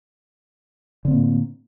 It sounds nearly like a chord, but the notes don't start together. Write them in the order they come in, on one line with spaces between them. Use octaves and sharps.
D3 C4 A#3 A2